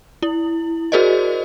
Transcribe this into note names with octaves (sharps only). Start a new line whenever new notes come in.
E4
F#4 G#4 A#4 C5 D5 D#5